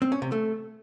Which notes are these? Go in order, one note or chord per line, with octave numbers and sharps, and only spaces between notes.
C4
C#4
C3
A3